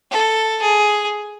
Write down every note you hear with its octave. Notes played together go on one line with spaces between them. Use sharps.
A4
G#4